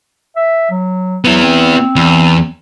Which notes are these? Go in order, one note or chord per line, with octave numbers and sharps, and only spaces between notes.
E5
F#3
F#3 B3 E4
C4
E2